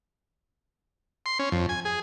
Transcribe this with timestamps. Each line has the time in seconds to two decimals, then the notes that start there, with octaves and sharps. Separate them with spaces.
1.26 C6
1.39 C#4
1.52 F2
1.69 G#5
1.85 G#4